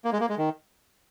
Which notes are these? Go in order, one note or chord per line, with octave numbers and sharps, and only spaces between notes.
A#3
G#3
A#3
G#3
D#3